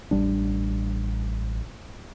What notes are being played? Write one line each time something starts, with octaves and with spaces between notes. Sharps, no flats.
A1 G3 D4